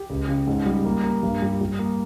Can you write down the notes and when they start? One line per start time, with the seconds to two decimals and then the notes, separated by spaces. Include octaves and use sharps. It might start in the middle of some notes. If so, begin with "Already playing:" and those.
Already playing: G4
0.10 C#2
0.28 C#3
0.47 G#2
0.66 G3
0.85 A#3
1.03 A#3
1.23 G2
1.42 G3
1.61 G3
1.79 A#3